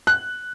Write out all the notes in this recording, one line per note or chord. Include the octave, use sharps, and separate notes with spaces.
F#6